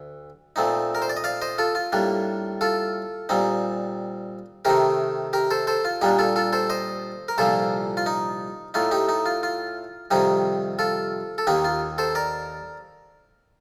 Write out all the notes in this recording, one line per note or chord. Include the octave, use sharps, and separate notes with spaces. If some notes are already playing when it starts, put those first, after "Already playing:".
Already playing: D2
A#2 A3 C4 D#4
A#4
C5
D5
D#5
D5 F5
C5 D#5
F4 A4
F4
A2 G3 A#3 D4
F4 A4
A#2 G3 C4 D#4
C3 D#3 A3 D#4 G4 A#4
G4 A#4
A4 C5
A4 C5
F4
A#2 G3 A#3 D4 D#4 G4
F4 A4
F4 A4
A4 C5
C5 D#5
A#4
C2 A#2 F3 A#3 A4 C5
F4
D#4
A2 A3 D#4 F4
D#4 G4
D#4
F4
F4
F2 C3 D#3 G3 D#4 G4
F4 A4
A4
D#2 D#3 A#3 D#4 G4
F4
A4 C5
A#4 D5